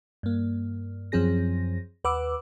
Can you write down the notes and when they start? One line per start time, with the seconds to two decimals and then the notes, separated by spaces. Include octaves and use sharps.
0.23 G2 A#3
1.12 F#2 F3 C4 G#4 A#6
2.04 D#2 B4 F#5 D6 E6